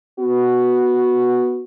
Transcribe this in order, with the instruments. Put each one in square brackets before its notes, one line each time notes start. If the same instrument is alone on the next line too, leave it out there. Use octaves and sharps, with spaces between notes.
[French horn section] B3 F#4